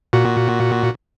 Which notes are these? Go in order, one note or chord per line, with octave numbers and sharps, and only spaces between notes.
A#2 F#4